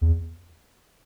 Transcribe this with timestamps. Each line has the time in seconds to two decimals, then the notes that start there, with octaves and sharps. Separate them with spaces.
0.01 E2